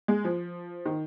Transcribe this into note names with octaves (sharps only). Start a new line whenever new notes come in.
G#3
F3
D#3